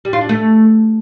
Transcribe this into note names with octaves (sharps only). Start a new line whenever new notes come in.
G3
F4
D4
A3